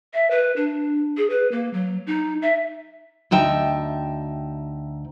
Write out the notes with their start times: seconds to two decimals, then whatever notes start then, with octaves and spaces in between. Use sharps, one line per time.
0.14 E5
0.31 B4
0.56 D4
1.17 G#4
1.30 B4
1.52 A#3
1.73 F#3
2.07 D#4
2.42 E5
3.31 D2 D#4 E5 G5 A5